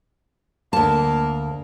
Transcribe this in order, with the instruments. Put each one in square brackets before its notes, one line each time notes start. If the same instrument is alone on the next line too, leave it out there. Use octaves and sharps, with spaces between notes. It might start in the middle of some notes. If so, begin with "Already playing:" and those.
[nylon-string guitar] D2 A5 [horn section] A#3